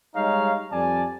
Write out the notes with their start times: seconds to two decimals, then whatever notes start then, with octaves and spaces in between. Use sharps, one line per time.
0.16 G3 G#3 D#4 C#5 F5
0.71 F2 G3 D5 G#5 A5